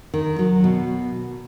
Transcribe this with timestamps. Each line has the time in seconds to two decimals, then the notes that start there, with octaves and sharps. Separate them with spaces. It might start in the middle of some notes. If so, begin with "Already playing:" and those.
0.14 D#3
0.39 F#3
0.64 B2